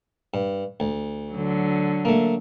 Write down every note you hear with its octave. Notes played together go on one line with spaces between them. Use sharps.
G2
D2
D3 F#3
A3 A#3